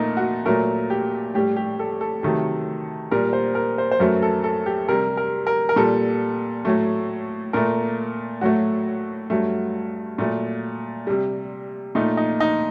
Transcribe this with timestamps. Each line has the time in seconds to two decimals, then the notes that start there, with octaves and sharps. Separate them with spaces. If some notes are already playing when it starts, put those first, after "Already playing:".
Already playing: A#2 A3 D#4 A#4
0.17 F#4
0.45 A#2 F#3 A3 A#4
0.90 G4
1.35 A2 G3 G4
1.56 G4
1.79 A4
2.01 A4
2.23 C3 D#3 F#3 A3
3.11 A#2 G3 A#4
3.33 C5
3.55 A#4
3.78 C5
3.91 C5
4.00 F#2 F#3 A3 A#4
4.22 A4
4.44 A4
4.66 G4
4.89 C3 G3 A#4
5.17 A#4
5.47 A#4
5.69 A#4
5.76 A#2 G3 A4
6.65 A2 F#3 A3
7.53 A#2 A3 A#4
8.41 A2 F#3 A3 F#4
9.30 G2 F#3 A3
10.18 A#2 F#3 A3
11.07 C3 G3
11.95 A#2 A3 D#4
12.17 D#4
12.40 D#4